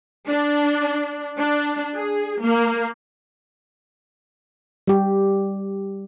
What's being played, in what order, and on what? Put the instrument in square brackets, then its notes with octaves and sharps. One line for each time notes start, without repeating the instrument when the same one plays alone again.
[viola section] D4
D4
G#4
A#3
[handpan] G3 G4